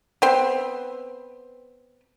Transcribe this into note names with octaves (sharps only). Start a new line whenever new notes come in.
B3 C4